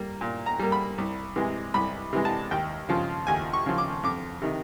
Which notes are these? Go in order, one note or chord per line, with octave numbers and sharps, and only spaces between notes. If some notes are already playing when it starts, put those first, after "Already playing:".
Already playing: G3 A#3
A#2
A#5
G3 A#3
B5
C2
C3 E3 G#3
C2 B5
C3 E3 G#3
A5
D#2 G5
C#3 F3
D#2 G#5
C#6
C#3 F3
D6
F2 D6
C3 D#3